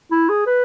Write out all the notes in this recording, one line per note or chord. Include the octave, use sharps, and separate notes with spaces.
E4
G#4
B4